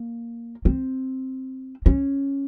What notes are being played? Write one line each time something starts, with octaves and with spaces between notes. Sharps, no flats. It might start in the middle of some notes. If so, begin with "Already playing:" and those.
Already playing: A#3
C4
C#4